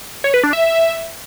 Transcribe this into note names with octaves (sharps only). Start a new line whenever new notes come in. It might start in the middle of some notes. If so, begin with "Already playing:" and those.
C#5
B4
D4
E5